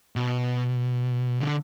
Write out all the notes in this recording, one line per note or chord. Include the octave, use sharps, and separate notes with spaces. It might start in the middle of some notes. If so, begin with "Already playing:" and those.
B2
D3